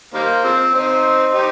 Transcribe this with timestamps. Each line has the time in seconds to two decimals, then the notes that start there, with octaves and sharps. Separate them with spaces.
0.14 D#3 G3 A#3 C5
0.44 F3 G#3 C4
0.74 C4 D#4 C5
1.32 D#4 G4